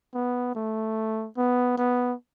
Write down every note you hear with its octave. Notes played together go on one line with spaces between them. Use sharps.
B3
A3
B3
B3